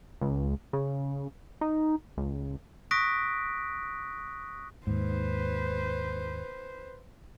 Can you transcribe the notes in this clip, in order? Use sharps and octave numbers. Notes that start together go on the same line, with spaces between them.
C#2
C#3
D#4
C#2
C#6 D#6 F#6 A#6 B6 D7
D#2 G#2 B4 C5